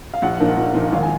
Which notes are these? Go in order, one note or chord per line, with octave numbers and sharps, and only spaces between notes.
F5
A#1 F#5
A#2 F3 A#3 D#4
A#1
A#2 F3 A#3 D#4
G#1 F5
G#5